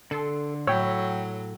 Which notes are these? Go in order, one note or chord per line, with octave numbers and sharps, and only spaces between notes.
D3 A4 C6
A2 F#3 C#5 G5 B5 C#6 E6